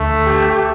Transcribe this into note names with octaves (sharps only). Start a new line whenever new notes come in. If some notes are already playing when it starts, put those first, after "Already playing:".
Already playing: D2 A3
G4